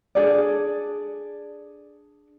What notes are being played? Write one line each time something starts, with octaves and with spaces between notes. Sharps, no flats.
D4 G#4 A4 D5